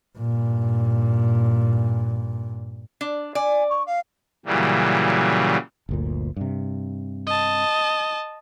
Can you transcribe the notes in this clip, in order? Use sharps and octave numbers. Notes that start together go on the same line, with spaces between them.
G2 A#2
D4
D5 G#5
C#6
F5
A#2 C#3 E3 F#3 G3
G1 D2 A#2
G2 C3
D#5 A5